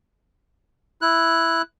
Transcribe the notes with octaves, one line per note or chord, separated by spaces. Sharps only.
E4 F#6